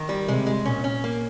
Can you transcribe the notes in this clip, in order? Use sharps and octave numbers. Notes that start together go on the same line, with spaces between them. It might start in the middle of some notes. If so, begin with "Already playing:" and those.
Already playing: D#3
G3
C3 G#3
G#3
A#2 C#4
C#4
A#3